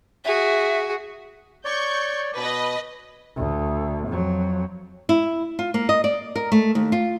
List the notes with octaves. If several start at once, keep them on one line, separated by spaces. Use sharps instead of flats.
F#4 G#4 E5
C#5 D5 C#6 G6
B2 B4 D#5
D2
F2 F#3
E4
F4
A#3
D#5
D5
A#4
A3
D#2
F4